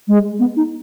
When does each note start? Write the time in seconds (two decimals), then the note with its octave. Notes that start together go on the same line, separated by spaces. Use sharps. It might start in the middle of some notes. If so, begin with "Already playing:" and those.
0.08 G#3
0.39 B3
0.57 D#4